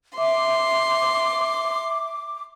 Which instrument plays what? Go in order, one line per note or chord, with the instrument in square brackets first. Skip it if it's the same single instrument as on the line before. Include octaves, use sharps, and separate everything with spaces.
[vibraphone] E5 [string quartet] C6 [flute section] D6